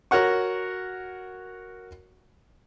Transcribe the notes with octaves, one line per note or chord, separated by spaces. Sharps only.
F#4 A#4 C#5 F#5 C#6